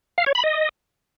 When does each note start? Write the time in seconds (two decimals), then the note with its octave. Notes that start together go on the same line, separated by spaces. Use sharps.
0.18 F5
0.26 C#5
0.35 B5
0.44 D#5